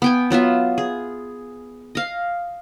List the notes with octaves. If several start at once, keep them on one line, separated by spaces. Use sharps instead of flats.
B3 G5 G#5
F#3 B3 F4 E5
G#4
D#5 F5